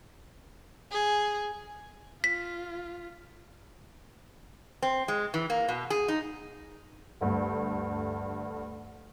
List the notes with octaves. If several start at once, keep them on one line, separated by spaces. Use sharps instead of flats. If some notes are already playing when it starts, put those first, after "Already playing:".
G#4
F4 B6
C4
G#3
E3
A#3
B2
G#4
D#4
D2 G2 A3